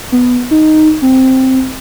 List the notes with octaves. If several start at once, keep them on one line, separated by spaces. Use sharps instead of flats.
B3
D#4
C4